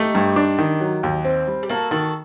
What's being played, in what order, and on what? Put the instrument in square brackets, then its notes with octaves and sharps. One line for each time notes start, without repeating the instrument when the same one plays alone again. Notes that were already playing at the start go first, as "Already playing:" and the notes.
Already playing: [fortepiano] A3 [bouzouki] D#4 G4
[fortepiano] G2
D4
D#3
F#3
D#2
C4
G3
[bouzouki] G4
[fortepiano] A#3 [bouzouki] F#4 A4
[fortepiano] D#3 [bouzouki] F#4 A4